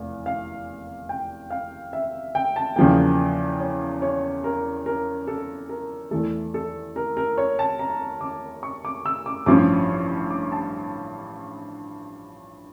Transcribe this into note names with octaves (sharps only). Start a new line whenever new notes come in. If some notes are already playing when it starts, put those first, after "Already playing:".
Already playing: F1 E2 F5
F5
G5
F5
E5
G5
A5
E2 C#3 F3 A#3 G5
C#5
C#5
A#4
A#4
A4
A#4
E2 E3 A3 A4
A4
A#4
A#4
C#5
A5
A#5
D6
C#6
D6
E6
D6
A1 G2 F3 C#4 D6
D6
A5